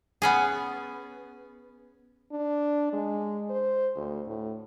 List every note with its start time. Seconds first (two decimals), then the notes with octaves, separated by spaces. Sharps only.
0.22 B3 C#4 G#4
2.32 D4
2.93 G#3
3.49 C5
3.95 D2
4.27 A2